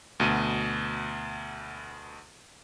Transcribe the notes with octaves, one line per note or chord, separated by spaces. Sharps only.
D2 B2 D#7